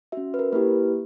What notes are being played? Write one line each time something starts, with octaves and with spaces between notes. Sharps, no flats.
C#4 F#4 E5
B4
A#4
A#3 E4 G4 B4